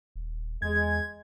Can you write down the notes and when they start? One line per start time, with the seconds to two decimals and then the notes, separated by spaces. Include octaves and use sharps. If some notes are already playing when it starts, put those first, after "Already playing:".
0.16 D#1
0.62 E2 G#3 G#6